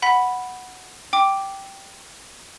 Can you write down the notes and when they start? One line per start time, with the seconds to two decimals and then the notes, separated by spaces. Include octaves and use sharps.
0.02 F#5 B5 B6
1.13 G5 D6